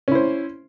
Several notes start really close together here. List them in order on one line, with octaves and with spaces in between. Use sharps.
C#4 E4 C5